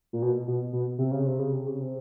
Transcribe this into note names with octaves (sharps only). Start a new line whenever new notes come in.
A#2
B2
B2
B2
C3
C#3
C3
C#3
C3
C#3
C3